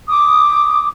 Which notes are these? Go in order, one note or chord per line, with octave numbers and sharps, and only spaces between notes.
D6 D#6